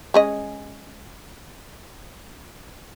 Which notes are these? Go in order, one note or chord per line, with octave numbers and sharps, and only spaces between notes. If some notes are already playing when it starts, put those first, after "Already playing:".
G#3 C#4 D#5